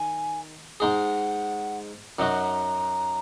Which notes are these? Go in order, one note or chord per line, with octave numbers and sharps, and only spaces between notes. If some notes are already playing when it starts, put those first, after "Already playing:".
Already playing: D#3 G#5
G#2 G#3 D#4 G#4 F#5
F#2 F#3 D#4 F#4 A#5